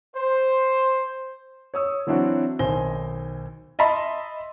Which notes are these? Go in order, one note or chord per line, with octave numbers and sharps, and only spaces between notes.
C5
C#5 D#6 E6
E3 F#3 C4 D4 E4 F#4
B1 D#3 C5 G#5 A#6 G7
D#5 E5 A5 B5 C6